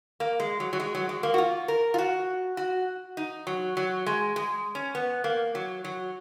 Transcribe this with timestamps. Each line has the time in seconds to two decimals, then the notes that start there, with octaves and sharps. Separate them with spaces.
0.20 A#3
0.40 G#3
0.60 F#3
0.73 F#3
0.80 G#3
0.95 F#3
1.09 G#3
1.23 A#3
1.34 F#4
1.38 F4
1.68 A#4
1.94 F4
1.98 F#4
2.57 F#4
3.17 D#4
3.47 F#3
3.77 F#3
4.06 G#3
4.36 G#3
4.75 C#4
4.95 B3
5.24 A#3
5.55 F#3
5.84 F#3